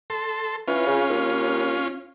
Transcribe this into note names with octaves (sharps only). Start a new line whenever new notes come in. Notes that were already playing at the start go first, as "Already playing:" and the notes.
A4 C6
E3 C#4 F4
C#3
D#2